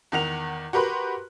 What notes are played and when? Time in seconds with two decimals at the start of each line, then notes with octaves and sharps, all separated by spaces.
0.12 E2 D#3 F#5 F7
0.73 F#4 G4 A#4 B4 C6 F#6